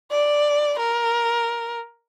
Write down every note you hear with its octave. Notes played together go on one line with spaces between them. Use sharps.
D5
A#4